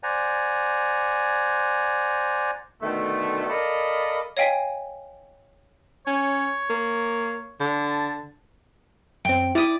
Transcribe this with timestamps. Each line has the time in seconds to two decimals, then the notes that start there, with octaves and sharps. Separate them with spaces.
0.03 C5 D5 F#5 G#5 A#5
2.82 B2 D3 D#3 A3
3.49 A4 A#4 D5 D#5 F5 B5
4.37 C#5 D#5 F5 G5 G#5 B6
6.07 C#4 C#5
6.70 A#3
7.60 D3
7.86 A5
9.25 F#2 C4 G5
9.55 E4 D5 D#6